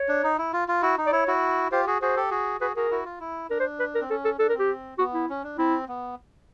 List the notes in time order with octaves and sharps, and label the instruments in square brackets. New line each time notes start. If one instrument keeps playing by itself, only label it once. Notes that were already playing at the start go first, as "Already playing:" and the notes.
Already playing: [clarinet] C#5
[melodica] D4
D#4
E4
F4
F4
E4 F#4
D#4
[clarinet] D5
[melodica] E4 [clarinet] C#5
[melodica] E4 F#4
[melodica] F4 G4 [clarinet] C5
[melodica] F#4 G#4
[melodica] F#4 G#4 [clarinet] C5
[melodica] G4 A4
F#4 G#4
[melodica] F#4 G#4 [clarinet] B4
[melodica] F#4 G#4 [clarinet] A#4
[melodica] E4 F#4
F4
E4
[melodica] D4 [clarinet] A#4
[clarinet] C5
B4
A#4
[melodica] C4
[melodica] C#4 [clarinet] A4
[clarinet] A4
[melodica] D4 [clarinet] A4
[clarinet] A#4
[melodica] C4
[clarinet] G4
[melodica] B3 [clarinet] F#4
[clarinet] E4
[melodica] C#4
D4
[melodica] C4 [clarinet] E4
[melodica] B3